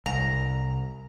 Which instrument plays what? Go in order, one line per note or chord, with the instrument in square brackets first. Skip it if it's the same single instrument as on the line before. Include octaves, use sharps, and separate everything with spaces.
[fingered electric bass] C2 [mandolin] A#5